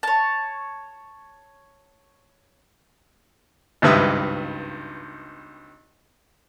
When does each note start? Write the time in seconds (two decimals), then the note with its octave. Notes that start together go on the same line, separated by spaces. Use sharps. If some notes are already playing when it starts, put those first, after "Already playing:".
0.03 C#5 A5
3.82 G#1 C#2 G2 B4 E5 D#6